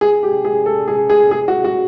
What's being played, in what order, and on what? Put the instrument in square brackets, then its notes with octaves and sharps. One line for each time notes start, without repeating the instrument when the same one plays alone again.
[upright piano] G#4
G4
G#4
A4
G#4
G#4
G#4
F#4
F#4